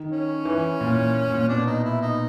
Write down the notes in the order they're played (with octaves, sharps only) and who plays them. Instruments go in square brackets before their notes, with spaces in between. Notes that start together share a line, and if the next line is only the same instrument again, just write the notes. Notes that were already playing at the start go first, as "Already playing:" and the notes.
Already playing: [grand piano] D#3
[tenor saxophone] C#4
[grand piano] E3
A#2
A#2
[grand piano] B2 [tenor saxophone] D4
[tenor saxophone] D#4
E4
D#4